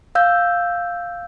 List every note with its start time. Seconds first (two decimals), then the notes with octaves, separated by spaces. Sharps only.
0.15 F5 E6 G6